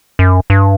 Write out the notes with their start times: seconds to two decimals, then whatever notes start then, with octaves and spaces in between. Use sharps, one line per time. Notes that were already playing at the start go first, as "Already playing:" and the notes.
0.19 F#2
0.50 G2